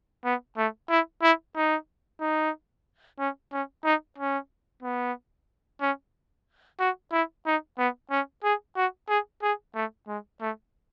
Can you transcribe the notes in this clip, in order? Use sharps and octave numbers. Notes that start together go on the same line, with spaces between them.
B3
A3
E4
E4
D#4
D#4
C#4
C#4
D#4
C#4
B3
C#4
F#4
E4
D#4
B3
C#4
G#4
F#4
G#4
G#4
A3
G#3
A3